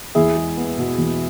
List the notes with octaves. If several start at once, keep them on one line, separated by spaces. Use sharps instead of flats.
E2 E4 G#4
G#3
B3
B2
E2